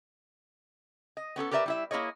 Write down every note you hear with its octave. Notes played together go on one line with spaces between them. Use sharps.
D#5
B3 C#4 G#4 A4
G4 A#4 B4 D5 E5
G3 E4 E5
A#3 E4 G#4 C#5 D#5